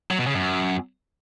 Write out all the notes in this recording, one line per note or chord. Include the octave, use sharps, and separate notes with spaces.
F#3
B2
C#3
F#2